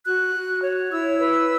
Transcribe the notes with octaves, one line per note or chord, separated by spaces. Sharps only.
F#4 F#6
F#4
C#5
E4 E6
B4